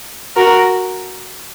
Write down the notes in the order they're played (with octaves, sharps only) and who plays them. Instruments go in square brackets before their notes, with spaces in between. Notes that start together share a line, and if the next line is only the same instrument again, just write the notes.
[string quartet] F#4 A#4